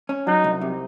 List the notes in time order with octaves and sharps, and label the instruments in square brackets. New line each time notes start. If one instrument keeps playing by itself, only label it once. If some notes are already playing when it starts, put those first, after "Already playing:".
[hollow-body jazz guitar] C#4
[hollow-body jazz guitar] F#3 [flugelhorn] D#4
[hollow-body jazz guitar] C2
C3